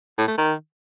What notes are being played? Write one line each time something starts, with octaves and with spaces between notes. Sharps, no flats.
A2
A3
D#3